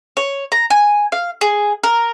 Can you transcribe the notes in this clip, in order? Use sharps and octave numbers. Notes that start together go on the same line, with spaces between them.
C#5
A#5
G#5
F5
G#4
A#4